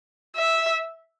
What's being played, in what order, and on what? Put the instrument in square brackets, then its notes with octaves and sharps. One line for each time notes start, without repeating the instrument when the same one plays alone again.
[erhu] E5